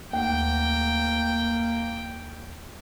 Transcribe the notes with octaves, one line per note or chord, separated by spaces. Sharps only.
D#2 A3 A#3 F#5 G5